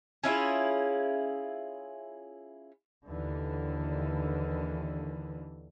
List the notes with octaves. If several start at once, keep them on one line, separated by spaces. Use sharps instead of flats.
C#4 E4 F4 G#4
D#2 D3 E3